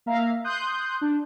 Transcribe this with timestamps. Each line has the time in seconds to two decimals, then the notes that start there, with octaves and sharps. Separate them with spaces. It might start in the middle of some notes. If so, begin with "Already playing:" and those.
0.06 A#3 E5 F5 A#5
0.44 C6 D#6 F#6 G6
1.01 D4